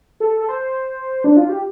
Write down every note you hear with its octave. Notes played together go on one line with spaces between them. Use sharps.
A4
A4
C5
D4
F4
G4